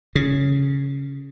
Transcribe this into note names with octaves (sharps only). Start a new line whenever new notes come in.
C#3